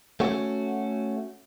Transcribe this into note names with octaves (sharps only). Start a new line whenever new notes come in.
A3 C#4 F#4